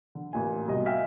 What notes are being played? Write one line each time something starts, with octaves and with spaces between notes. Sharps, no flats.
D3
A1 A#2 G#5
C2 B2 D#5
E5 F5 G5 G#5 F6 B6